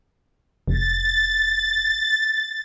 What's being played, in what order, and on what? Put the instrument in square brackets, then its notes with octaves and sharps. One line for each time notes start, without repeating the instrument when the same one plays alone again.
[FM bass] F1 [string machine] A6